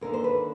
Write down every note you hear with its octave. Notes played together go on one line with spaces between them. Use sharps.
D#2 D3 A#4
C5
B4